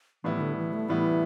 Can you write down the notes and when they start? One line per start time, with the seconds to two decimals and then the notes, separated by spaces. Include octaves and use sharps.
0.23 A2 E3 G3 B3 E4
0.35 E3
0.41 D3
0.57 E3
0.73 A3
0.89 A2 E3 G3 B3 E4